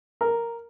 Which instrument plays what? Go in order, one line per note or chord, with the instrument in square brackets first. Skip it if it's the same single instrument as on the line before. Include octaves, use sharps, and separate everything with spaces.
[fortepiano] A#4